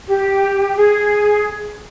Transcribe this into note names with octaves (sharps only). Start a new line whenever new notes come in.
G4
G#4